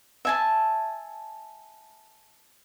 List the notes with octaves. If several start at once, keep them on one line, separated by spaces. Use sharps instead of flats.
E5 G#5 A5